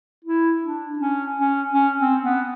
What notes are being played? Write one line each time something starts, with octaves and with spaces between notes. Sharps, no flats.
E4
D4
C#4
C#4
C#4
C4
B3